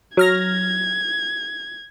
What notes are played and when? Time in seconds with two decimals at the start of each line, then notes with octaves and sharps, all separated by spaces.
0.17 F#3 F6 G#6 A#6